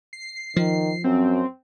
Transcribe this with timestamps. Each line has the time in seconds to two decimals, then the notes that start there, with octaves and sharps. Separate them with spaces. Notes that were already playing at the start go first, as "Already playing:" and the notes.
0.13 C7
0.56 D#3 F3
1.04 F#2 C4